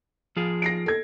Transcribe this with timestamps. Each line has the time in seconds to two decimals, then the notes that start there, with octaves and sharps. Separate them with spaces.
0.36 F3 F4 G#4
0.62 A#6 C7 D7
0.86 A4 G#6